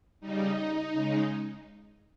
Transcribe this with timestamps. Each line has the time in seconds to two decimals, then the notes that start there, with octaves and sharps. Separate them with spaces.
0.21 C#3 G3 D#4
0.93 C#3 G#3